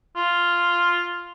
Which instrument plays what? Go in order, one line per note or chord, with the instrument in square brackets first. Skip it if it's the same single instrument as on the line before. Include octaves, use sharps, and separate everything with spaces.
[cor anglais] F4